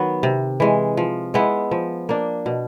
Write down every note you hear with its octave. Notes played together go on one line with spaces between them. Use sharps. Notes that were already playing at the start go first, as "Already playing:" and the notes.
Already playing: D#3 F#3 B3
C3
E3 G#3
F3
G#3 B3 E4
F3
A#3 D4
B2